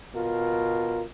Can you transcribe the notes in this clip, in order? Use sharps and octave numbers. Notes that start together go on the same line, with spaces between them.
B2 F4 A#4